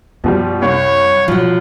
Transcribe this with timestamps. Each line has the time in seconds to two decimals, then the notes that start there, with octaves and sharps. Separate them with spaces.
0.24 F#2 B2 F3 G3
0.62 C2 C#5
1.28 B2 F3 F#3